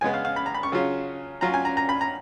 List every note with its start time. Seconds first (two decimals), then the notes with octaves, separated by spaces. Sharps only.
0.01 C#3 G#3 B3 G#5
0.14 F5
0.25 F5
0.36 B5
0.46 A#5
0.54 B5
0.63 C#6
0.72 C#3 F#3 C#4 F4
1.41 F#3 C#4 F4 A#5
1.54 G#5
1.65 A#5
1.77 A#5
1.89 B5
2.01 A#5